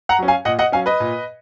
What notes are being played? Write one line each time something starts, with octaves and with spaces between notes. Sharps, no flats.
F#5 A#5
F#3 C#4
F5 G#5
A#2 D#5 F#5
D#5 F#5
F#3 C#4 F5 G#5
B4 D#5
A#2